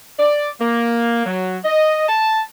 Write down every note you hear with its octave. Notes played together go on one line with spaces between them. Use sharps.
D5
A#3
F#3
D#5
A5